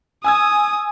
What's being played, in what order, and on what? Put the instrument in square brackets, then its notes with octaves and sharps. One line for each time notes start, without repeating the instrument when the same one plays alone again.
[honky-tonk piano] G#5 E6 G#6 [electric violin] D#6